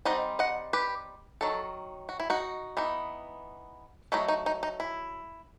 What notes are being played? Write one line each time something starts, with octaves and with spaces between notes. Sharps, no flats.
G3 C4 D#4 D#5 F#5
D#5 F#5
G4 B4
D#3 F#3 A4
F#4
E4
D#4 F#4
E3 B3 D#4
F#3 A3 D#4 E4
D#4
D#4
D#4
E4